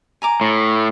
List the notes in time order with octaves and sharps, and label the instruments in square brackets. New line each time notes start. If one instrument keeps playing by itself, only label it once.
[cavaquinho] G#5 A#5 D6
[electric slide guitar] A2